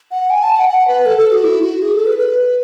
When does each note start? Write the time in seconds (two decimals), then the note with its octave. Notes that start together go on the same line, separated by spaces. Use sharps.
0.11 F#5
0.30 G#5
0.43 A5
0.56 F#5
0.69 F#5
0.88 B4
1.06 A4
1.18 A4
1.32 F#4
1.44 E4
1.62 F#4
1.82 G#4
1.93 A4
2.06 B4
2.19 B4